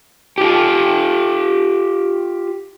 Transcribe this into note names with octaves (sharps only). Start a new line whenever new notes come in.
F4 G4